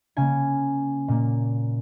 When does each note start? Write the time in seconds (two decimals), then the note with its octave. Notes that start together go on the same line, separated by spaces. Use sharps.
0.17 C#3 A#3 G#5
1.08 A#2 A#3